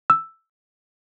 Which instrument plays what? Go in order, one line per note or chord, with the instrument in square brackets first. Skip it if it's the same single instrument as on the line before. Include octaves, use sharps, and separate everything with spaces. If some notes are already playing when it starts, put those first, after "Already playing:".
[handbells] E6